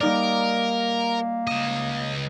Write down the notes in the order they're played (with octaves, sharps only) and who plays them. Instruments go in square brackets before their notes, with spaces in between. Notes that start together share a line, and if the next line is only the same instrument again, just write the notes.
[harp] G3 D#4 D5 [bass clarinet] A#3 [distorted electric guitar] A#4
[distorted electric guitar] C#2 D#5 [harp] D#6 E7